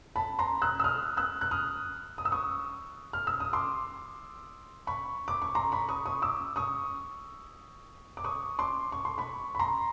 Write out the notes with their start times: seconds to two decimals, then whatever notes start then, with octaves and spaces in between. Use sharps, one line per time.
0.16 A5 B5
0.39 A#5 C6
0.62 E6 F#6
0.80 E6
0.84 D#6 F6
1.17 E6 F#6
1.41 F#6
1.51 D#6 F6
2.18 D#6
2.25 E6
2.32 C#6 D#6
3.13 F6
3.27 E6
3.40 D#6
3.53 C6 D6
4.87 B5 C#6
5.28 D6
5.42 C#6
5.55 A#5 C6
5.72 B5 C#6
5.89 C#6 D#6
6.06 C#6 D#6
6.22 D6 E6
6.56 C#6 D#6
8.17 D6
8.25 C#6 D#6
8.59 C6 D6
8.92 C#6
9.05 C6
9.18 B5 C#6
9.55 B5
9.59 A#5 C6